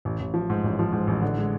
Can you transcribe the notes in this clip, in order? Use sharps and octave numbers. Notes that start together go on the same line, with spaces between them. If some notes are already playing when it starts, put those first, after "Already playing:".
A1
A1
F3
G#2
A1
F3
G#2
A1
D3
G#3